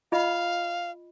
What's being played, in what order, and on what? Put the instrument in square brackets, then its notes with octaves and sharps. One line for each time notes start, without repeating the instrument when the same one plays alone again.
[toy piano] F4 D#5 B5 [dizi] F5